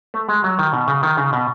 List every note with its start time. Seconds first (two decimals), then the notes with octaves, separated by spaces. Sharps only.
0.14 A3
0.29 G#3
0.44 F#3
0.59 D#3
0.73 B2
0.88 C#3
1.03 D#3
1.17 C#3
1.33 B2